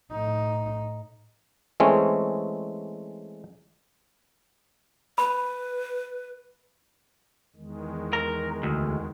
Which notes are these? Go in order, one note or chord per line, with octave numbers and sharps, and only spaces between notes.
A2 D#4
E3 G#3 A3 C4 C#4
B4 B5
E2 D#3 G#3
A#4
D2